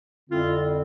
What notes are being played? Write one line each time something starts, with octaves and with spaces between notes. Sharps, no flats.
F2 D3 G3 C4 E4 F4